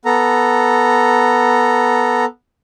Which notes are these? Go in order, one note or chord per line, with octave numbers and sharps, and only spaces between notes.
B3 A4 A#5